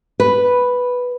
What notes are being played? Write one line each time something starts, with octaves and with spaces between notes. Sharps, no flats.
B4